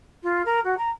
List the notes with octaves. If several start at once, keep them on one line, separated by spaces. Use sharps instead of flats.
F4
A#4
F#4
A#5